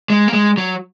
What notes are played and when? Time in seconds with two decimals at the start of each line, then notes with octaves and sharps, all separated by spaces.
0.10 G#3
0.28 A#3
0.34 G#3
0.58 F#3